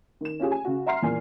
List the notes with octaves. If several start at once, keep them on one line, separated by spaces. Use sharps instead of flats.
D#3 E7
C#4 F4 G4 G#4
G#5
C#3 F#4
E5 F#5 A#5 C6 F6 C7
E2 A#2 G#5